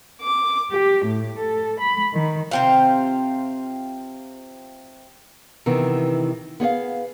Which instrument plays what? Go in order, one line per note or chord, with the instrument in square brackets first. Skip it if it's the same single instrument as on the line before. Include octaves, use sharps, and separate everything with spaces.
[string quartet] D6
G4
A2
A4
B5
D#3
[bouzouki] C3 C4 F4
[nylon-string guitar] C3 D#3 E3 B3
B3 G#4 C#5 F5